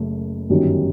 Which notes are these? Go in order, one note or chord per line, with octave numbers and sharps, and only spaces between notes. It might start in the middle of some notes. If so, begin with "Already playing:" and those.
Already playing: F#1 F#2 A3
G1 F#2 D#3 G3